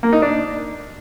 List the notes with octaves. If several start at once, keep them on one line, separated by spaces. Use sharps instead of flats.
A#3
D#4
D4